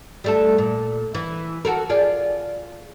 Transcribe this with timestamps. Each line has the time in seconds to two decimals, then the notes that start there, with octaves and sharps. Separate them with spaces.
0.24 G3 A3 A4
0.58 A#2
1.15 E3
1.65 F#4 A4 A#4
1.89 F4 G#4 D5